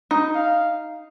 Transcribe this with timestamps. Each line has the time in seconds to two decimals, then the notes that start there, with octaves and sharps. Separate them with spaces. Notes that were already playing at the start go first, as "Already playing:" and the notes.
0.11 D#4
0.35 F5